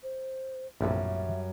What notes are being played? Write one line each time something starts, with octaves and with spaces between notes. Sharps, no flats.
C5
A#1 F#2 A2 C3 G3 E5